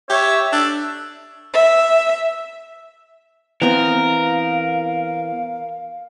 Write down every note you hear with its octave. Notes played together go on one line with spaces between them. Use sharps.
G4 C#5 E5
D4 A4
E5
E3 B3 C4 A#4 F5